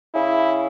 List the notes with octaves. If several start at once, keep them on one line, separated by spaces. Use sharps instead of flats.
C#3 E4